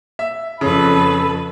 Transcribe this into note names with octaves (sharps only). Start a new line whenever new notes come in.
E5
F2 C#3 A4 B4 B5